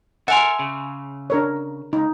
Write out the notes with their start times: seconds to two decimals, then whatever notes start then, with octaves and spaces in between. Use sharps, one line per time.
0.28 A4 A#4 E5 F#5 G#5 C6
0.59 C#3
1.30 D4 A#4 C#5
1.93 C#2 D#4